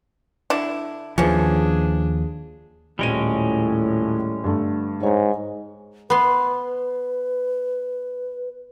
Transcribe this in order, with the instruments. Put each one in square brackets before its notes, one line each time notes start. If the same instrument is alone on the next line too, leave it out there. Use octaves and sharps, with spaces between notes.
[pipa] D3 D4 E4
[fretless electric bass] D#2 F3 [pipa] E3 C#4 [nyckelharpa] D4 G#4
[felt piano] D#1 D7 D#7 [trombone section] A2 [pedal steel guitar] G3 G#3 C#4
[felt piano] G2 D3 A3
[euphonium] G#2 [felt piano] C#5 A#5
[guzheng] B3 C6 [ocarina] B4